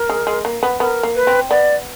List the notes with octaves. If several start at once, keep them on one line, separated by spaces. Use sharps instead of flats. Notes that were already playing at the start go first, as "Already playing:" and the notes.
Already playing: A#4
G#3
G#3
A#3
B3
B3 A#4
A#3
B4
C4
B3 D5